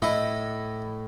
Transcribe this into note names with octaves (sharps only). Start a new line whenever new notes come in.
A2 E4 D#5